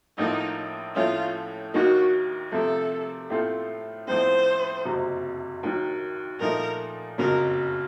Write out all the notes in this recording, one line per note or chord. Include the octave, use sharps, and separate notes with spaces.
A1 A2 F3 A#3 D#4
A2 F3 A3 C#4 F4
D#2 D#3 A#3 D#4 F#4
C3 F3 A3 A4
A2 A3 C4 F4 A4
A1 A2 F3 C4 C5
F#1 F2 C3 F#3
D#2 D#3 F#3
A#2 F3 A3 D#4 A#4
F#1 F2 C#3 F#3 A#4